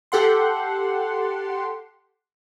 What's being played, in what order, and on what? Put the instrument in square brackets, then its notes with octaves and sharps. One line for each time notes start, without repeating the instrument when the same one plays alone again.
[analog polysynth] G4 A4 F#5 C6